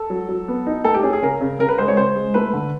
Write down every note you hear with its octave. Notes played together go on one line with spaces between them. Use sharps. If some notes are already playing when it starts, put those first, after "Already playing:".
Already playing: A4
F#3
F#3
B3
D#4
A3 A4
G4
C#4 G#4
G#4
C#3 A#4
C#3
C#3 A#4
B4
G#3 C5
C#5
C#3 C5
G#3
A3 B4
D3